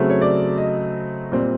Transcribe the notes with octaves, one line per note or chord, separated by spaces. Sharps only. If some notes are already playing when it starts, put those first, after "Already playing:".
Already playing: C#3 F#3 A3 C4
C#5
D5
D#5
A#2 G3 C4